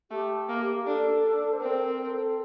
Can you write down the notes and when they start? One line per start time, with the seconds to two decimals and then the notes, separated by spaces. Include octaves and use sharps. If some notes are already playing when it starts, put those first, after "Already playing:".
0.11 A3 G4
0.49 A#3
0.86 D4 A4
1.24 D4
1.53 C5
1.60 C4 A#4
1.86 A#4
2.10 A4